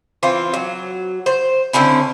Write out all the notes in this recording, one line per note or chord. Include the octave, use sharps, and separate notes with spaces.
E3 C4 F4
F#3
C5
D3 C4 C#4 E4